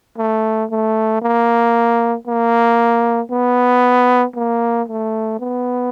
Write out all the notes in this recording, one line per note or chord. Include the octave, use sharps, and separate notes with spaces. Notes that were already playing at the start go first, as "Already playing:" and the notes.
A3
A3
A#3
A#3
B3
A#3
A3
B3